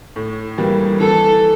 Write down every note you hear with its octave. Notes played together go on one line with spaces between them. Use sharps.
A2
E3 G3 A#3
E3 A4